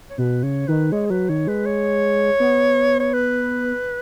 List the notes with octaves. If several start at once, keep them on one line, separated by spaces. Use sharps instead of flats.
C#5
B2 B4
C#3 C#5
D#3 B4
G#3 C#5
G#4
F#3 B4
D#3 C#5
G#3 B4
C#5
B3
C#5
B4